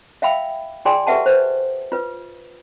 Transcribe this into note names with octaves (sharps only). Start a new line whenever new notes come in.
E5 F5 G5 B5 E6
F4 G#4 D5 G5 G#5 C6
G4 A4 B4 E5 F#5 A5
B4 C5
F4 B4